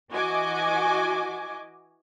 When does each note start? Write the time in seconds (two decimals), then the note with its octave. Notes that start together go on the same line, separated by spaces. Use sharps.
0.11 E3 F#4 D#5 G#5 D6